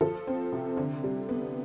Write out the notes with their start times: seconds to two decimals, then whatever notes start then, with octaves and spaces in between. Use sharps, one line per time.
0.01 F3 A4
0.27 C4
0.52 C3
0.77 D3
1.04 G3
1.29 B3